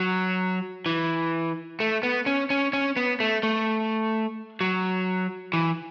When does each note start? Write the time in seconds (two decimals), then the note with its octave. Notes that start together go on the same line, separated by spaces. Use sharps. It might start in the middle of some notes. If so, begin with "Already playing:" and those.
Already playing: F#3
0.86 E3
1.80 A3
2.03 B3
2.26 C#4
2.50 C#4
2.73 C#4
2.97 B3
3.20 A3
3.43 A3
4.61 F#3
5.53 E3